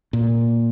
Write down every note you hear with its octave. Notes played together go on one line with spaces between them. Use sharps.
A#2